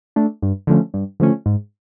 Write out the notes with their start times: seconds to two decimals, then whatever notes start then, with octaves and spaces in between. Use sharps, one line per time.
0.16 A3 D4
0.42 G2
0.67 D3 F3 A3 C#4
0.94 G2
1.20 D3 F3 A3 C#4
1.46 G#2